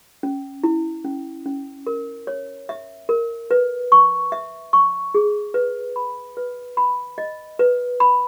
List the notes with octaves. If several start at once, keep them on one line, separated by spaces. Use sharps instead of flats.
C#4
E4
C#4
C#4
A#4
C#5
E5
A#4
B4
C#6
E5
C#6
G#4
B4
B5
B4
B5
D#5
B4
B5